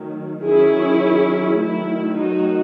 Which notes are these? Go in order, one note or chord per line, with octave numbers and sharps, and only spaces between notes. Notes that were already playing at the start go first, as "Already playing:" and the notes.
Already playing: D#3 F#3 A3
D#3 F#3 C#4 E4 G#4
D#3 F#3 A3 E4
D#4 F#4